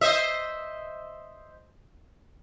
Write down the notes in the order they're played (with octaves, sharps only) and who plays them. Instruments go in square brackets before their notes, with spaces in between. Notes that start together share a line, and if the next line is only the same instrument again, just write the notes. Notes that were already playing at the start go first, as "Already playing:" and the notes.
[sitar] C5 D#5 E5